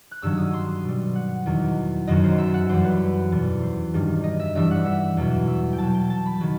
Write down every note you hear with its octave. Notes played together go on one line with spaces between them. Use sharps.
F#6
G2 D#3 F#3 E6
D#6
C6
B2 G3
F#5
E2 D#3 F#3
F#2 D#3 F#3 D#5
C5
E5
F#5
F#2 E3 G3 C5
B4
E2 B2 G3
C5
G2 D#3 G3
D#5
E5
G2 E3 G3 E5
F#5
E5
E2 B2 F#3
E5
G5
B2 F#3 A5
G5
A5
B5
D#3 F#3